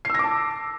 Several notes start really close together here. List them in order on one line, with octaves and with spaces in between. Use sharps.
C7 E6 A#6 D6 A5